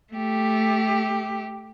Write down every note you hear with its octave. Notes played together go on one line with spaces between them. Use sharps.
A3 G4